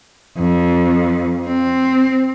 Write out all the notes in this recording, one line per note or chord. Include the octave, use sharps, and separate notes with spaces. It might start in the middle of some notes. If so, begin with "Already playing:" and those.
F2
C4